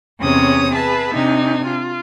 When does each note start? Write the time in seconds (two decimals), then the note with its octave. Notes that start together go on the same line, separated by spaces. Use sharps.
0.21 E2 C3 C#4 G#4 C#5 D#6
0.74 G#4 B4 E5 A5
1.13 C3 D4 D#4 G#5
1.66 F4